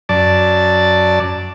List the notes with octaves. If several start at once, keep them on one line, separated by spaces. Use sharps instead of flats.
F#2 D5 A5